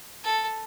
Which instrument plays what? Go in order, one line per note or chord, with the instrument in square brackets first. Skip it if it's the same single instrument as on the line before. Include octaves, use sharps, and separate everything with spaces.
[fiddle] A4